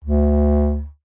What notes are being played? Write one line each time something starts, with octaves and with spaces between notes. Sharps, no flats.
D2